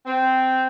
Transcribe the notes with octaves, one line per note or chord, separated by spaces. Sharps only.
C4